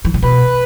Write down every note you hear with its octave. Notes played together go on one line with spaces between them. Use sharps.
E3
C#3
B2 B4